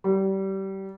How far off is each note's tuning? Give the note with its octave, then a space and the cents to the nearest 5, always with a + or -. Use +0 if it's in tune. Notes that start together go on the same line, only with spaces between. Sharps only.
G3 -25